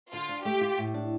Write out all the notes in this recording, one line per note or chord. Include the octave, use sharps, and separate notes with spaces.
D3 F4
D4
A3 G4
F4
A2
D4